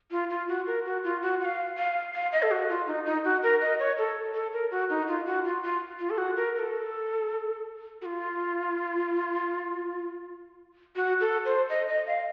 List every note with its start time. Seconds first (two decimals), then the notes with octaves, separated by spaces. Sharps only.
0.11 F4
0.30 F4
0.48 F#4
0.67 A#4
0.85 F#4
1.04 F4
1.22 F#4
1.40 F#5
1.45 F5
1.77 F5
2.14 F5
2.32 D#5
2.42 A4
2.51 F#4
2.69 F4
2.87 D#4
3.06 D#4
3.24 F#4
3.43 A#4
3.61 D#5
3.79 C#5
3.98 A4
4.34 A4
4.53 A#4
4.71 F#4
4.90 D#4
5.08 F4
5.26 F#4
5.45 F4
5.63 F4
5.99 F4
6.10 A4
6.18 F#4
6.37 A#4
6.55 A#4
6.59 A4
8.02 F#4
8.05 F4
10.96 F#4
11.21 A4
11.45 C5
11.69 D#5
11.88 D#5
12.07 F5